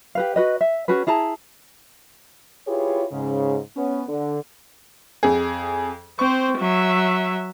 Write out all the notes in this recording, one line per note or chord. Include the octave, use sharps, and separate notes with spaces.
G4 B4 F5
F#4 B4 D#5
E5
C#4 F#4 G#4 B4
E4 G#4 A5 A#5
E4 F4 G4 G#4 B4 C#5
G#2 C#3
B3 C#4
D3
F2 G#4
C4 C5 C#6
F#3 E5